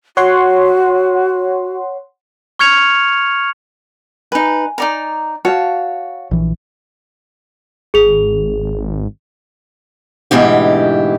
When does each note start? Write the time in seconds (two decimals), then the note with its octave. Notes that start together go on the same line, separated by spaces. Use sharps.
0.17 F#4 C#5 F#5 C6
2.59 C#6 F6 G#6 C#7 F7
4.32 D#4 B4 G#5
4.78 D#4 D5 A#5
5.45 F#4 C#5 F5 A5
6.31 A#1 E3
7.94 G#1 G#4 F7
10.31 D2 G#2 B2 E3 G4